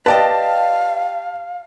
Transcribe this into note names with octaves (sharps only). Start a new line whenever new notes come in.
G4 B4 D5 D#5 F5 A5